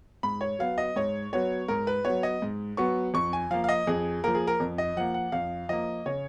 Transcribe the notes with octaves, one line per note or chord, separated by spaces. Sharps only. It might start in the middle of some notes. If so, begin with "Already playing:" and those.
G#2 B5
C#5
F#3 B3 F5
D#5
G#2 C#5
F#3 B3 C#5
G#2 A#4
B4
F#3 B3 C#5
D#5
G#2
F#3 B3 C#6
F2 C#6
G#5
F3 A#3 F5
F5
D#5
F2 G#4
F3 A#3 A#4
G#4
A#4
F2
D#5
F3 A#3 F#5
F#5
F2 F5
F3 A#3 D#5
C#3 C#5